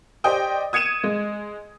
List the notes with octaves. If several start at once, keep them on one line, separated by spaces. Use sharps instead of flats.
G4 C5 D5 D#5 G5 D#6
D#6 G#6 C#7 D#7 E7
G#3